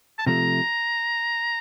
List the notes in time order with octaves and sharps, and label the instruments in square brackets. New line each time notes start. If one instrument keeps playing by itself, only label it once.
[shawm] A5
[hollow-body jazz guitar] C3 F3 A3 [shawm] A#5